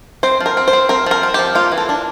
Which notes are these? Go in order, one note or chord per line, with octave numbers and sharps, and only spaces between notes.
C4 C5
F3
A#4
C4
C5
C4
C4 A#4
F3 A#4
C4
F3 G4
A#3 F4
E3
A4
D4